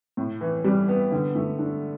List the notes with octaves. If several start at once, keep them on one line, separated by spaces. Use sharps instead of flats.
A2
E3
G3
B3
D3
A3
D4